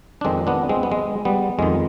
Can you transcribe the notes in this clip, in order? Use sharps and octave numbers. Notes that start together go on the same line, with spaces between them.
D4
F2 D#3 G#3 C4
B3 D4
G#3 C4
B3
G#3
G3 B3
F2 D#3 G#3